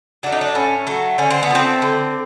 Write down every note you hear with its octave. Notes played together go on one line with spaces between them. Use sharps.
F#3 A3 D4
D#4
D4
A2 C#4
F#3 A3
D3 C#4
C4
B3
F3 A3 C4
D3